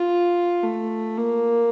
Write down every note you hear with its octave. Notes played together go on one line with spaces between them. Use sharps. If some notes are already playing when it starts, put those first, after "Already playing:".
Already playing: F4
A3
A#3